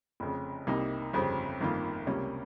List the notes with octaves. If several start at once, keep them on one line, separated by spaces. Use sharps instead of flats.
F1 F2 C#3
C2 C3 G3 A#3 D#4
G1 F2 C#3 G3 C4
G1 F2 D#3 A#3 F4
C#2 C3 G3 A#3 C#4